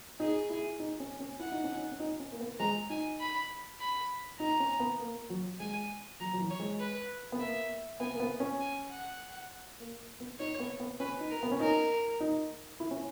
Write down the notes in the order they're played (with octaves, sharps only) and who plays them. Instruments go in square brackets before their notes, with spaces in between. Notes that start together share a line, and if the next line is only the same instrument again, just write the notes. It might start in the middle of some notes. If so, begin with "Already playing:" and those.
[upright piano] D#4 [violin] G#4
[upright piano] E4
D#4
C#4
C#4
[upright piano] E4 [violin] F#5
[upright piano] D#4
C#4
D#4
C#4
D#4
C#4
A#3
B3
[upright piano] G#3 [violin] A#5
[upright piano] D#4 [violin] G#5
[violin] B5
B5
[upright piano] D#4 [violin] A#5
[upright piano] C#4
B3
A#3
F#3
[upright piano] G#3 [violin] G#5
[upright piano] F#3 [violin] A#5
[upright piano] F#3
E3
[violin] C#5
[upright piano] G#3
[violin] B4
[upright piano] B3
[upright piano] A#3 [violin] E5
[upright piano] B3 [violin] G#5
[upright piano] A#3
B3
C#4
[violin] G#5
F#5
[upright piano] A#3
B3
[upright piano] D#4 [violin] C#5
[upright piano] B3
B3
[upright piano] C#4 [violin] B4
[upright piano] D#4
[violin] A#4
[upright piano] B3
C#4
[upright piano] D#4 [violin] A#4
[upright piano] D#4
E4
C#4